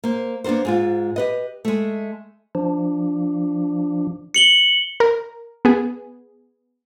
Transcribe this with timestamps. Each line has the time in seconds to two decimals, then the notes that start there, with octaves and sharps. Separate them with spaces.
0.04 A#3 C5
0.44 A#3 B3 D4 A#4 C5
0.65 G#2 G#3 F4
1.16 G4 B4 D#5
1.65 G#3 A3
2.55 F3 D4
4.34 C#7 F#7 G7
5.00 A#4
5.65 B3 G#4